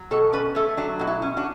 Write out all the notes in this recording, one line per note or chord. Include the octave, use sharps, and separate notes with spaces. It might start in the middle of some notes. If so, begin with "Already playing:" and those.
Already playing: F#3
B2 A4 C#5
C#4 B4 D5
A3 A4 C#5
F#3 D4
B2 F#4
E4
C#4
D4 F#4